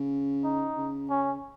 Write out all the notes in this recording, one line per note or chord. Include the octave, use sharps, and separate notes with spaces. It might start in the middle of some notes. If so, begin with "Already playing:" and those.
Already playing: C#3
D#4
C#3
C#4